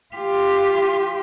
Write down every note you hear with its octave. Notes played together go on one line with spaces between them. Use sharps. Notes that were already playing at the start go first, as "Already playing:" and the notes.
F4 G4